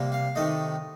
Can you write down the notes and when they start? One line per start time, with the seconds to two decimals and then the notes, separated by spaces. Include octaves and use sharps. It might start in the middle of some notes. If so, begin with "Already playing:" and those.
Already playing: C3 G3 A#3
0.12 F5
0.35 C3 D#3 A3 D#5